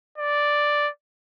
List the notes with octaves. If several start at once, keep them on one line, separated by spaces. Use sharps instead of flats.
D5